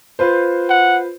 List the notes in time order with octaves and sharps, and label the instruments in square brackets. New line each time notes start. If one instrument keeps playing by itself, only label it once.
[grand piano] F4 B4 C5
[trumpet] F#5